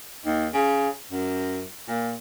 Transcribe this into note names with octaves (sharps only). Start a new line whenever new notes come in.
D#2
C#3
F#2
A#2